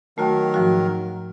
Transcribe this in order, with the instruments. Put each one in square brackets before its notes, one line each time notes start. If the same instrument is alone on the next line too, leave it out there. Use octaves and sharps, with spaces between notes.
[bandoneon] D#3 F#3 A#4 [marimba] A3 F#4 G5
[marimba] G#2 F3 F#4